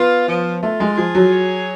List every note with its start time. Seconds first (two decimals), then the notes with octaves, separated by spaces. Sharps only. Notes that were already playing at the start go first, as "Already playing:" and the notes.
Already playing: B3 F4
0.28 F3
0.62 A3 F4
0.80 G#3
0.97 F3 G#4
1.15 F#3
1.32 C#5